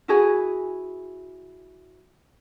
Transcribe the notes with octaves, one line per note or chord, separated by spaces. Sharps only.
E4 F#4 G#4 G#5